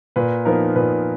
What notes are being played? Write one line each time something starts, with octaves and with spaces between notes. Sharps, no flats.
A#2 B4
F3 B3 D#4 A#4
A#2 B4